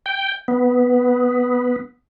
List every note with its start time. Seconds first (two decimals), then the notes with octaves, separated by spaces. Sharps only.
0.06 G5
0.48 B3